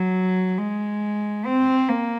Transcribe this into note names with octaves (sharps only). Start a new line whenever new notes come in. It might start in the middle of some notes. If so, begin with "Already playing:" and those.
Already playing: F#3
G#3
C4
A#3